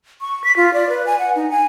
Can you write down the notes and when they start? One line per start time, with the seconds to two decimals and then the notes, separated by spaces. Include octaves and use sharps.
0.21 C#6
0.44 B6
0.56 F4
0.73 D5
0.89 B4
1.06 G#5
1.19 F#5
1.36 D#4
1.50 G#5